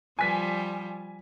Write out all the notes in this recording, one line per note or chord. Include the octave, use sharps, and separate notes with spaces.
F3 G3 G#5 B6